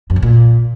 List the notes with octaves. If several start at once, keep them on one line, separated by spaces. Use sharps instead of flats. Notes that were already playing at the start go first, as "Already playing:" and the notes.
F#2
C#3
A#2